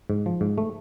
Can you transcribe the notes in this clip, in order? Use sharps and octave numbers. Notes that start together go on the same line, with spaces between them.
G#2
F3
G#2
A3